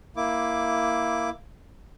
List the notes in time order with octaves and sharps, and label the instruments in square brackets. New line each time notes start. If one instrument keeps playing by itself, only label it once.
[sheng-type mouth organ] A#3 E4 D6